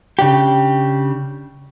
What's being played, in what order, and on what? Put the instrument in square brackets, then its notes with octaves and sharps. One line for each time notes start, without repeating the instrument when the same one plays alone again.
[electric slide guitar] C#3 D4 G4